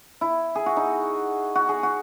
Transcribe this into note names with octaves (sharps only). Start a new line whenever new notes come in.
E4
G#4
F#4
D#4
F#4
G#4
F#4